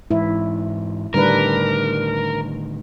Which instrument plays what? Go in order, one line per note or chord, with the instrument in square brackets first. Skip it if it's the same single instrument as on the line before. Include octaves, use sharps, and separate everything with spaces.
[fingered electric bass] G#2 E3 [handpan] E4
[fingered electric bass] A2 D3 D#3 [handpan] G3 D4 B4 [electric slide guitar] A#4